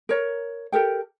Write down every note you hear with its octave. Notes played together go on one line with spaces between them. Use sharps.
A#4 C#5
G4 A4 A#4 G5